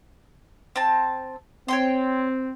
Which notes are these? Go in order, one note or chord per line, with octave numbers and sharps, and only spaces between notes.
C4 A5
C4 C#5 G5 C6